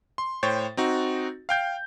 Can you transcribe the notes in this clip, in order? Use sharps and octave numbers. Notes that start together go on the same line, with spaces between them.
C6
A2 C5 C#5 G5 A6
C4 D#4 F#4
F5 G5 G6